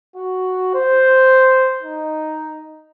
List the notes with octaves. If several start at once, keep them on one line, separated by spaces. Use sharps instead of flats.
F#4
C5
D#4